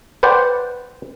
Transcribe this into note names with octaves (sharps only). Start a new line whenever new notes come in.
B4 C5 D5 F#5 G5